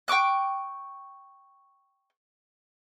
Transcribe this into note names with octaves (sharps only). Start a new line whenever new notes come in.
G5 C#6 D6 F#6